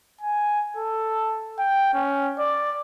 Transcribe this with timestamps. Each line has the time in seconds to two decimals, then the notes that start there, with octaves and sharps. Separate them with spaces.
0.21 G#5
0.77 A4
1.58 G5
1.94 C#4
2.39 D5